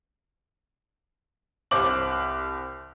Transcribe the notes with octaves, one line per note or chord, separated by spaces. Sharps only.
C2 C5 D6 F#7